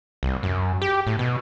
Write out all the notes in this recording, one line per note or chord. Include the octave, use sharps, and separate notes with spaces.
C2
F#2
G4
A2
B2